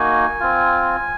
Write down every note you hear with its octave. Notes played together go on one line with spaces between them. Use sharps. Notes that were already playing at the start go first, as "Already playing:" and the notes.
Already playing: A#3 D#4 F#4 G#5
C4 F4